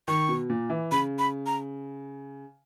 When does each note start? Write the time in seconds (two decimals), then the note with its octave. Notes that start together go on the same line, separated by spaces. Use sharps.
0.08 D#3 C#6
0.29 B2
0.50 A#2
0.70 E3
0.91 C#3 B5
1.19 B5
1.46 A#5